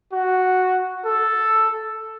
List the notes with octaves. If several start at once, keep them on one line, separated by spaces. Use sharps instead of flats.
F#4
A4